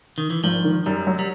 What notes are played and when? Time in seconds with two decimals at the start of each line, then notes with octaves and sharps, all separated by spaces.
0.18 D#3
0.30 E3
0.44 G#1 F3
0.64 D#3
0.86 F#2 G3
1.07 F#3
1.19 G3